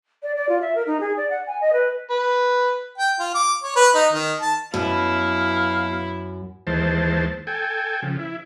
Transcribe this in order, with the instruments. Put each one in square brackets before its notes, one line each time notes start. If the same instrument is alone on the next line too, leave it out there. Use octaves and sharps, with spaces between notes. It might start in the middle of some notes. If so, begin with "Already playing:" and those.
[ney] D5
D5
F4
E5
A#4
D#4
G#4
D5
F#5
G#5
D#5
B4
[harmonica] B4
G5
F4
D6
C#5
B4
D#4
D#3
A5
[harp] F#2 [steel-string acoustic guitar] B2 [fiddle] E4 [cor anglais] F5
[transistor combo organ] D#2 E3 G#3 C5 A5
A4 G5 G#5
C#3 F3
E4